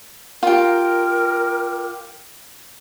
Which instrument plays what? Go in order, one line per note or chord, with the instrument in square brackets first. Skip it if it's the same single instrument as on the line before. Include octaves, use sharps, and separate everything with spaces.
[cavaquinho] F4 G4 [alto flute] A#4